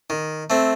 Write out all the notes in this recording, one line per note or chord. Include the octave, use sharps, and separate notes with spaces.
D#3
A3 C4